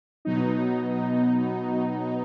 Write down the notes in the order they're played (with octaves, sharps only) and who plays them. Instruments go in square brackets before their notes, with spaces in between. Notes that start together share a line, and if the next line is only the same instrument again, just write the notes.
[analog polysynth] B2 F#3 B3 D#4